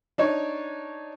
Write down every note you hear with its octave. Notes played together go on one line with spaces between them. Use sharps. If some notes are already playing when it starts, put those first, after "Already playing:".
D4 D#4 C#5